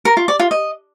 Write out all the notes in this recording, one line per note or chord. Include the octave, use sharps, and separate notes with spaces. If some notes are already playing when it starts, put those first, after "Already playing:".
A#4
F4
D5
F4
D#5